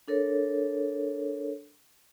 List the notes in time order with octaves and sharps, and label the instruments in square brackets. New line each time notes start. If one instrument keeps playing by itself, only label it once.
[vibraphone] D4 A4 A#4 C#5